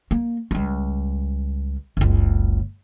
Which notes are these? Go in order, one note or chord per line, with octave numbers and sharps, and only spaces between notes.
A#3
C#2 G3
F#1 C#2